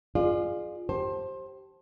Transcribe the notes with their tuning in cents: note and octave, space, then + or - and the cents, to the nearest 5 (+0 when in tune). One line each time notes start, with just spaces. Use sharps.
F4 +0 G#4 +0 D5 +40
G4 -15 C5 +20 A5 +0